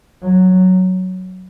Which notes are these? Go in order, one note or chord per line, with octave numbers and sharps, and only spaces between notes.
F#3